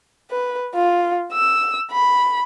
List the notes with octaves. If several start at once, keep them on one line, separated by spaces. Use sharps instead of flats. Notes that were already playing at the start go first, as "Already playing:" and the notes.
B4
F4
E6
B5